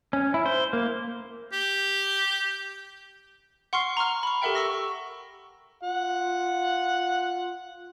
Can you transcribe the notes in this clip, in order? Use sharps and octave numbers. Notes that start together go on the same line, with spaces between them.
C#4
E4
C5
A#3
G4
F#5 C6 C#6 F6 C7
A#5 C6 C#6 F6
B5 C#6
G4 A4 A#4 E5 F#5 G5
C#6 E6 A#6
F4 F#5